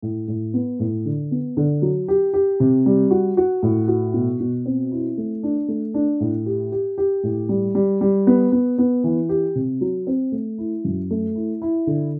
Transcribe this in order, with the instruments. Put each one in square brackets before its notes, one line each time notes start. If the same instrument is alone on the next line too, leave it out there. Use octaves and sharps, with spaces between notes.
[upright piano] A2
A2
B3
A2
D3
B3
D3
F#3
G4
G4
C3
G3
F#4
F#4
A2
F#4
B2
B2
C4
E4
A3
D4
A3
D4
A2
G4
G4
G4
A2
G3
G3
G3
B3
B3
B3
E3
G4
C3
F#3
C4
A3
E4
F#2
A3
E4
E4
D3